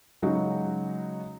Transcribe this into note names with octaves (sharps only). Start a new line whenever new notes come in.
C#3 F#3 G#3 D#4 F#4